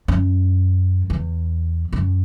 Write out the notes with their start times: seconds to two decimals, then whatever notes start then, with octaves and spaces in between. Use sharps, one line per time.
0.08 F#2
1.10 E2
1.92 F#2